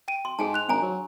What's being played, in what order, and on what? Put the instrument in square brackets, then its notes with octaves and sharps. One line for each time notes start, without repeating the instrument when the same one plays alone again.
[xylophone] G5 D7 D#7
[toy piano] C6
[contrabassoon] G#2 [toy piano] G#4 G#5 A5
[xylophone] C6 F#6 F7
[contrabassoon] G#1 [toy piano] D4 G#5 A#5
[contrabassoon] F#3